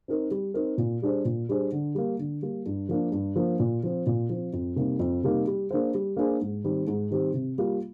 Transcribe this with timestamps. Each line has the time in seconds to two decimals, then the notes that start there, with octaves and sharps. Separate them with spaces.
0.08 C4 D#4 A#4
0.31 G3
0.54 C4 D#4 A#4
0.78 A#2
1.02 G3 D4 G#4 C5
1.25 A#2
1.49 G3 D4 G#4 C5
1.72 D3
1.95 G3 A#3
2.19 D3
2.42 G3 A#3
2.66 G2
2.89 F3 A#3 D4
3.12 G2
3.36 F3 A#3 D4
3.59 A#2
3.83 F3 C4
4.06 A#2
4.29 F3 C4
4.53 F2
4.76 C3 G3 A#3 D#4
4.99 F2
5.23 C3 G3 A#3 D#4
5.47 G3
5.71 A#3 D4 G#4 C5
5.94 G3
6.16 A#3 D4 G#4 C5
6.41 G#2
6.64 D#3 G3 C4 G4
6.87 G#2
7.11 D#3 G3 C4 G4
7.34 C3
7.58 G3 A#3 F4